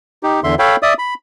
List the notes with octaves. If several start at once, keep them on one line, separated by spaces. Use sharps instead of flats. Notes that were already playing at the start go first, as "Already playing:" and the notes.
D#4 G4
E2 D3 E5 C6
A4 C#5 F5 G5 B5
D5 E5 D#6
B5